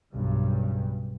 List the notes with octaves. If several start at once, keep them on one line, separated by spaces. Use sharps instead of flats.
B1 G2 C#3 G3